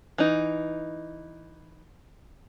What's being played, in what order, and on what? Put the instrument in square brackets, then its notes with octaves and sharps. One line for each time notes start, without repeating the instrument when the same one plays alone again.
[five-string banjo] E3 D#4